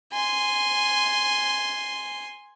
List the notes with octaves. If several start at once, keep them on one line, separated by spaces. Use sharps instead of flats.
G#5 C6